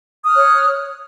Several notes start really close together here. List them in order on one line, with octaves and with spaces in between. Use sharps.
D#6 F6 F#6 C#5